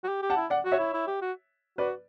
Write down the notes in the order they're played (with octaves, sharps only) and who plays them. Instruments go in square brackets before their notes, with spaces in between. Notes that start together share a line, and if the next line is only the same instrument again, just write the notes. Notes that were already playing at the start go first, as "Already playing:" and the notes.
[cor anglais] F#4
G4
G4
[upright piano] F#5 A5
[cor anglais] E4
[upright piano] D5 F#5
[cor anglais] F#4
[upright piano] C#5 E5
[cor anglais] E4
E4
G4
F#4
[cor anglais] F#4 [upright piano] B4 D5